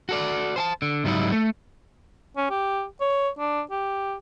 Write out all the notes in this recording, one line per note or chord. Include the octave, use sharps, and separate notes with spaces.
F#4 A4 D5
C5 G#5 A5
D3
C#2 G#2 F#3 G3 D#4 E4
A3
C#4
G4
C#5
D4
G4